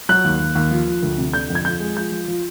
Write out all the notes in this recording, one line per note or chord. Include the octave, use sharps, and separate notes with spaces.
F#3 F#6
D#2
D#2
D#2
F3
F3
D2
C3
D3 G6
F2
G#6
F3 G6
G#3
F3 G6
F3
F3